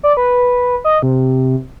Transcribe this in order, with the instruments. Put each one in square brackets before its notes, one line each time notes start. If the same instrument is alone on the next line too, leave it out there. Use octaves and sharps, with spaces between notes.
[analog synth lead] D5
B4
D#5
C3